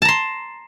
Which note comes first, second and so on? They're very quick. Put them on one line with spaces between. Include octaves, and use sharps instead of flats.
A5 A#5 C6